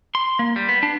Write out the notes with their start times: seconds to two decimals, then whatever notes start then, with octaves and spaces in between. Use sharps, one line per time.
0.15 C6
0.39 A#3
0.56 G3
0.69 B3
0.83 D4